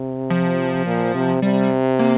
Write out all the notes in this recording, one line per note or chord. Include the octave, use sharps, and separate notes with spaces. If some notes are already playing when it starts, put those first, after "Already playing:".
Already playing: C3
F3
A#2
C3
C3 G3
A#3